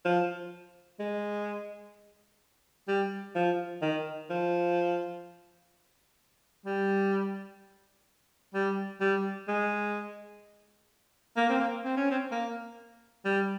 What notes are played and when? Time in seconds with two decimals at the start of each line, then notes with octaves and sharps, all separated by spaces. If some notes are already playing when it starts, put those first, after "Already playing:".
0.05 F3
0.99 G#3
2.88 G3
3.35 F3
3.82 D#3
4.30 F3
6.66 G3
8.54 G3
9.00 G3
9.48 G#3
11.37 A#3
11.49 C4
11.60 A#3
11.84 C4
11.97 C#4
12.11 C4
12.31 A#3
13.25 G3